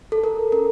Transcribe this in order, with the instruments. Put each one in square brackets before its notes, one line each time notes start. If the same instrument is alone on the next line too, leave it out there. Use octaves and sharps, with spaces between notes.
[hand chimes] A4
A4 A#4
C#4 A#4